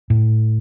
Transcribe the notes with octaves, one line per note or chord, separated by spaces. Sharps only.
A2